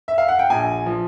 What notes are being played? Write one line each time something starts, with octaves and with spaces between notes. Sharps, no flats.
E5
F5
F#5
G5
A#1 G#5
F3